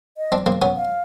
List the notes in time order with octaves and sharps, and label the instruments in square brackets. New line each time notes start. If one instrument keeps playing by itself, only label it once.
[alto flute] D#5
[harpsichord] C4 D4
A#3 C4
B3 C#4
[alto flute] F5